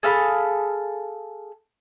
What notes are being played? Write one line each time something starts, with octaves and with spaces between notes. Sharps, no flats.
G#4 A4 F5 B5